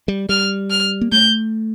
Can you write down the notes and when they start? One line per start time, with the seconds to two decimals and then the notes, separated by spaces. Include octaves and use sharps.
0.08 G3
0.29 G3 F6
0.71 F6
1.01 A#3
1.12 A3 G6